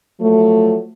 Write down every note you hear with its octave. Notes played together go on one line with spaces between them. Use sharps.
F3 F#3 A3